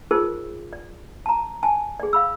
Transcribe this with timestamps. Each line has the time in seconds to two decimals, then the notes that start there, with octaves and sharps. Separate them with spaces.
0.11 D#4 F4 G#4 A#4 C5
0.73 D5
1.26 A5 A#5
1.63 G#5 A5
2.00 G#4 D5
2.13 F5 B5 E6